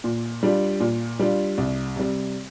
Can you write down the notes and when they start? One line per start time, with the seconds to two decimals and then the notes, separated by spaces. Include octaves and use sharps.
0.04 A#2
0.43 G3 D4 F4
0.80 A#2
1.19 G3 D4 F4
1.58 C2
1.96 C3 G3